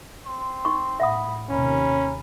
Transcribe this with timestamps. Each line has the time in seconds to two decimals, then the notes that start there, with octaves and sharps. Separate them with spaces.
0.23 C4 C6
0.65 D#4 C#6
1.00 A2 E5 F#5 B5 D#6
1.49 D#2 C3 C#4 A#4 B5